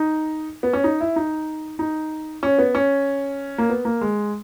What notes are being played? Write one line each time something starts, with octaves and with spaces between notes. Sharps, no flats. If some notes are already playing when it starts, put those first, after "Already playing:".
Already playing: D#4
B3
C#4
D#4
E4
D#4
D#4
C#4
B3
C#4
A#3
B3
A#3
G#3